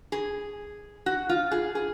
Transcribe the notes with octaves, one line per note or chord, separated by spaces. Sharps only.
G#4
F#4
F4
G#4
G#4